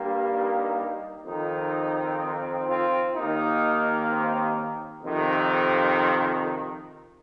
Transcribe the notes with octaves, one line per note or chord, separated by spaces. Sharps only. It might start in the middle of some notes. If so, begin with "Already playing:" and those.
Already playing: G2 G3 A#3
D#4
F2 D#3 C4 D#4
C4 F4
D#2 D#3 A#3 D#4
C4
F2 C3 D#3